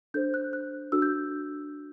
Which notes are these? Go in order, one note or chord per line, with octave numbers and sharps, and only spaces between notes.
D4 A4 C5 G6
F#6
F#6
D4 F#4 A4 E6
G6